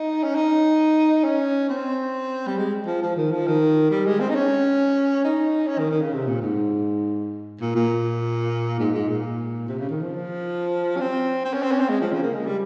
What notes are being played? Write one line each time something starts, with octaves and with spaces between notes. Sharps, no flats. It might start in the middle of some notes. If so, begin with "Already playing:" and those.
Already playing: D#4
C#4
D#4
C#4
C4
G3
G#3
F3
F3
D#3
F3
D#3
G3
G#3
C4
D#4
C#4
D#4
C#4
D#3
D#3
C#3
C3
A#2
G#2
A#2
A#2
G#2
G#2
A#2
C3
C#3
D#3
F3
C#4
C4
C4
C#4
C4
C#4
C4
G#3
F3
C#3
A#3
G#3
G3